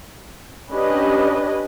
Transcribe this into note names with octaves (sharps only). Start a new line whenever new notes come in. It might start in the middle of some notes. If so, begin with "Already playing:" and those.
C#4 D4 G4 B4 D#5